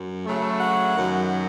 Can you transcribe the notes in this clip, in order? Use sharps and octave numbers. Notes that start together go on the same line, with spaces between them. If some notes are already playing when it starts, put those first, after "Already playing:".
Already playing: F#2
C#3 F#3 A3
F#5
F#2 D#3 F#3